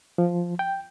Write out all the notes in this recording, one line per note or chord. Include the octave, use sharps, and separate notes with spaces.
F3
G5